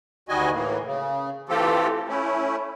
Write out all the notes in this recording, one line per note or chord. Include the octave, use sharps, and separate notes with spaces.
D2 D#3 G3 F#4 D#5 G#5
A2 E3 A#3
C#3
E3 A3 C4 F4 G4 A4
A3 C#4 E4